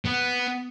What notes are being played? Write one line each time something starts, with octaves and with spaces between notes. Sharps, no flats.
B3